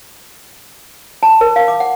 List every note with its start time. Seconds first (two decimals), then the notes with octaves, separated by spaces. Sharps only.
1.23 A5
1.41 A#4
1.56 F5
1.68 D6
1.80 F#5